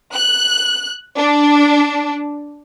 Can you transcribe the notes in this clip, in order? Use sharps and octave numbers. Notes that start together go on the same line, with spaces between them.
F#6
D4